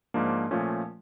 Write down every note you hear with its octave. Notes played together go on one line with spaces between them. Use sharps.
G#2 F3 A#3 D4
A#2 F3 A3 C#4